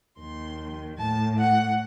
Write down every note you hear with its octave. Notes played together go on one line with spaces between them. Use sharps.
D#2 D#3 C6
A2 A5
F#5